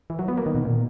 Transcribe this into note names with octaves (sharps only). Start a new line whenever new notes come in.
E3
F#3
B3
A#3
D#3
B2
A#2